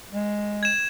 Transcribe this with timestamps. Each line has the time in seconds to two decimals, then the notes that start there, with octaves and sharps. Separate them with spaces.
0.13 G#3
0.63 G#6 E7